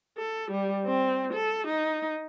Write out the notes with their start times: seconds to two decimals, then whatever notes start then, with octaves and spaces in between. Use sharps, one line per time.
0.18 A4
0.51 G3
0.86 C4
1.33 A4
1.67 D#4